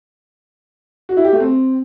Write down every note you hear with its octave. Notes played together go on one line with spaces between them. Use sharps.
F#4
E4
G4
A3
C4